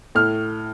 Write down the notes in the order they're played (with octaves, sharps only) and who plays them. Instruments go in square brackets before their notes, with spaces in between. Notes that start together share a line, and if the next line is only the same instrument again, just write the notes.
[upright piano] A2 F6